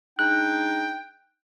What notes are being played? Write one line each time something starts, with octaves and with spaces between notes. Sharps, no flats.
G#3 D4 D#4 G5 F#6